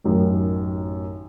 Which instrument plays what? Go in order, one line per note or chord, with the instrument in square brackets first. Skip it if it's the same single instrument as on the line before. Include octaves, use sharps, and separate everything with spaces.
[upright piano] A1 F#2 D#3